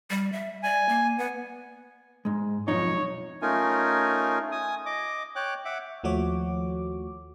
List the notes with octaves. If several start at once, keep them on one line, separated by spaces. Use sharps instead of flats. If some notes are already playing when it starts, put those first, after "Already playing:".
G3
E5
D5 G#5
A#3
B3 F#5
G#2 G#3
B1 F2 D#4 C#5
A3 C#4 D#4 F4 A#4 G#5
G#5 D#6
D#5 D6
C#5 G5 D6 F#6
E5 F#5 D6
D#2 F3 A3 F#4 C#5 D6